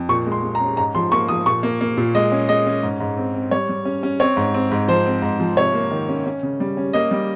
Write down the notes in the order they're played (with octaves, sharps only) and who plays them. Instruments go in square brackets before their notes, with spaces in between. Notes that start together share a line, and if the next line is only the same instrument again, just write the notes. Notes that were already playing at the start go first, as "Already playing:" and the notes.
Already playing: [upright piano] F2
A#2 C#6
G#3
C6
G#3
A#5
C#4
G#2 A#5
F3 C6
A#3 C#6
F3 D#6
A#2 C#6
A#3
A#3
A#2
G#3 D#5
C#4
G#3 D#5
C#4
G#2
G#2
C4
C4
G3 C#5
G3
C#4
C#4
C4 C#5
G#2
C4
G#2
F3 C5
C4
G#2
F3
C3 C#5
A#3
D#3
C#4
C#4
C#3
G3
C#4
A#3 D#5
G3